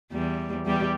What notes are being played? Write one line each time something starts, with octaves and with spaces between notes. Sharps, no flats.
E2 G3
E2 G3 G4